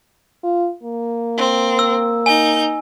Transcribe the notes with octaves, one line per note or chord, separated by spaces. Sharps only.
F4
A#3
C4
E6
D#4 G#5 G6